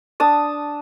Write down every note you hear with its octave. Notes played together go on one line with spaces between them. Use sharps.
D4 A5 D#6